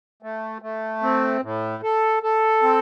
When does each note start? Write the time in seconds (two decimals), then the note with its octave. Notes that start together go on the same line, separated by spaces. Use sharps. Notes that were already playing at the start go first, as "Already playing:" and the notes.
0.23 A3
0.62 A3
1.02 C4
1.42 A2
1.83 A4
2.23 A4
2.62 C4